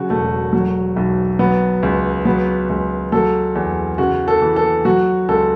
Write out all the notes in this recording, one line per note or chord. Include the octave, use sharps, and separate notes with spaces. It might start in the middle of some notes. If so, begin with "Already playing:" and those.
Already playing: C#3 F#3 F#4
E1 A3
F#3
B1
F#3 B3
C#2
F#3 B3
C#2
F#3 A4
E2
C#3 F#4
A4
E3
A4
F#3 F#4
C#2 A4